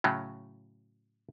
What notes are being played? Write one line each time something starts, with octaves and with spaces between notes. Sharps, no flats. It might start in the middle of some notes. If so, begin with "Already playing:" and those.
A2 C#3 F#3